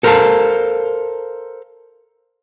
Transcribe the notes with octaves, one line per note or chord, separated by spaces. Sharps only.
A4 A#4 C5 E5 F5 A5